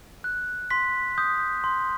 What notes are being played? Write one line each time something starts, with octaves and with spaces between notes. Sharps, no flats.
F#6
C6 B6
D#6 G6
C6